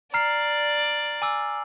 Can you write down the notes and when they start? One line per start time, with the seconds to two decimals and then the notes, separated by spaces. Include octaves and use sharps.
0.14 D5 A#5 F6 C7
1.22 G#5 D6 E6